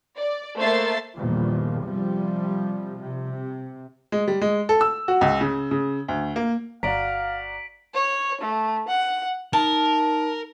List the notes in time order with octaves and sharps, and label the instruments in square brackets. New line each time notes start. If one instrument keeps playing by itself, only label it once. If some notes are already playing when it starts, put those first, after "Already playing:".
[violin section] D5
A3 A#3 C5 E5 A6 C7
[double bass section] E2 G2 A#2 D#3 F3
C3 F3 G3
C3
[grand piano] G#3
G3
G#3
A4
E6
F#4
C#2
C#3
C#3
D2
A#3
[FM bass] G1 [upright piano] F#4 D5 A#5 [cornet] F5 [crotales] B6 D7 F#7
[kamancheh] C#5
A3
F#5
[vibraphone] D#4 [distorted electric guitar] A#4 [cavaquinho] A5